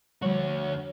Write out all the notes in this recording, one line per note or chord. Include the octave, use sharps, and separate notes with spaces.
D2 F3 G3 F#4 C#5